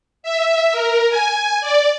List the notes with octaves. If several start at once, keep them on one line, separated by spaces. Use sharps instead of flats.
E5
A#4
G#5
D5